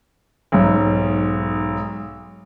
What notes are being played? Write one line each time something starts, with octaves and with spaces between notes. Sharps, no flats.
B1 G#2